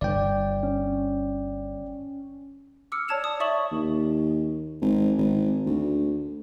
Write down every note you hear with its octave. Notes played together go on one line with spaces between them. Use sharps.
G1 D5 G5
C#4
D6 E6 F6 C#7
C#5 D5 A5 G#6 E7 F7
D#6
D5 E5 C#6 D#6 E7 F#7
D#2
G#1
G#1
D2